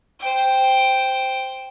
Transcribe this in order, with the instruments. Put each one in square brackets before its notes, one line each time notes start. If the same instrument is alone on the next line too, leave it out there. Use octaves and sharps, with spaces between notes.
[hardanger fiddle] C5 G5